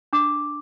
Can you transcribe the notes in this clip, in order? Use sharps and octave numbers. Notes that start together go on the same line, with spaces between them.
D4 D6